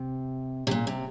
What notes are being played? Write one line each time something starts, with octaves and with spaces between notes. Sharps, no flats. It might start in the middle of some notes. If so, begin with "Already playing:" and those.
Already playing: C3
C3
A#2
C3